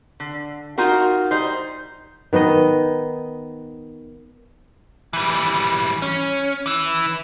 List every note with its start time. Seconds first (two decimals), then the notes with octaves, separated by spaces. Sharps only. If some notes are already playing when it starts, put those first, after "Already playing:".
0.20 D3
0.78 D#4 F4 F#4 A#4
1.31 G3 D#4 C5
2.33 D#3 B3 D#4 D#5
5.13 E3 G3
6.02 C#4
6.66 E3 E4